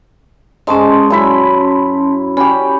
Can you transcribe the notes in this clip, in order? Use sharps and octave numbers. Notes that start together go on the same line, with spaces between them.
G#2 G#3 C#4 A5 C6
F#2 E4 B5
C#4 G4 B5